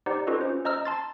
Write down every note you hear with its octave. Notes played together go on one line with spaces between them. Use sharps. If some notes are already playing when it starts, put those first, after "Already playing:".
D#4 G4 C5 D5 F#5 A#5
C#4 F4 F#4 A4 B4 D#5
C#4 C5
C5 D#5 A#5 E6 F6
A5 C6 A6